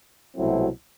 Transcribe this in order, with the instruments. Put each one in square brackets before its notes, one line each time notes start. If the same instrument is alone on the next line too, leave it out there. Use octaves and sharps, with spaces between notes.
[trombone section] C2 B2 F#3 A3 C4 E4